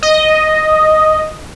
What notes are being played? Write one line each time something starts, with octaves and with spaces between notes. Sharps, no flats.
D#5